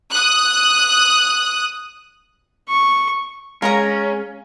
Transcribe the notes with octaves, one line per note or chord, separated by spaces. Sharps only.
D#6 F#6
C#6
G#3 C#4 A#4 C#5 F5 A#5